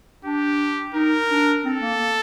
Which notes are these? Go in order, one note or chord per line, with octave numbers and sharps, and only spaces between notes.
D4 G4
D#4 A#4
D4
C4 A4
A#3
A#3